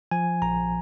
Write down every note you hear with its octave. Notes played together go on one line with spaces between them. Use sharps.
F3 G#5
A#1 A#5